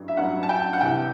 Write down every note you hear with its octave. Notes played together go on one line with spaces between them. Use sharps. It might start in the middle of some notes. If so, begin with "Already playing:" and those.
Already playing: A1 G2 F#3
E5
A1 G2 F#3 F#5
A5
G5
F#5
C2 C3 E3 G5